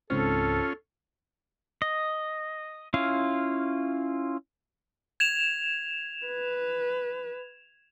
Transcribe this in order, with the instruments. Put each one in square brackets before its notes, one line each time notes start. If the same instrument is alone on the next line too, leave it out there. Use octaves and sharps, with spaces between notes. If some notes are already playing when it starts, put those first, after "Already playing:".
[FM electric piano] C#2 G#2 C4 [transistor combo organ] C#4 F4 [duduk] A4
[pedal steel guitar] D#5
C#4 E4 F4 F5
[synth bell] G#6 E7 F7
[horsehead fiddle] B4